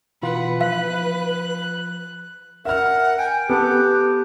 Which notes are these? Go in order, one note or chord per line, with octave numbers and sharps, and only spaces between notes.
B2 E3 F4 B4 F#5
F3 F5 F#6
A#4 E5 F#5 F6
G5 G#5
B3 G4 A4 F#6